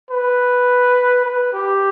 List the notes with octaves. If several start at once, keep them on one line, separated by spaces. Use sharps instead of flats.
B4
B4
G4